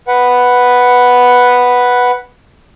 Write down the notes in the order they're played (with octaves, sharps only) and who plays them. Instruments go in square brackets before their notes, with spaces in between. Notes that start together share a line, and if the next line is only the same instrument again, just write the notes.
[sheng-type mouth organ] B4 F#5